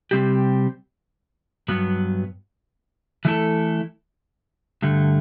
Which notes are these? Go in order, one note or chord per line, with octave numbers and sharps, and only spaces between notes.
C3 G3 C4 G4
G2 F#3 B3
E3 A3 E4 A4
G2 D3 A3